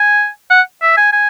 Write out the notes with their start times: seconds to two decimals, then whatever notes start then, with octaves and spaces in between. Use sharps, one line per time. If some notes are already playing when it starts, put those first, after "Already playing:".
Already playing: G#5
0.50 F#5
0.82 E5
0.97 G#5
1.13 G#5